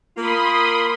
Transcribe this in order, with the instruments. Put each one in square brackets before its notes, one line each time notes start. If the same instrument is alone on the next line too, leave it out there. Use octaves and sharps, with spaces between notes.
[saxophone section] A#3 F4 [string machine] B5 C6 D#6